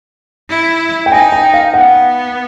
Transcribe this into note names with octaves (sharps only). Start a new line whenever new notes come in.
E4
G5
D#4 G#5
G5
F5
B3 F#5